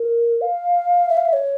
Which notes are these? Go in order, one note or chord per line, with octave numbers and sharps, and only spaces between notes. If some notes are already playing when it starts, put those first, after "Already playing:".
Already playing: A#4
F5
E5
F5
E5
C#5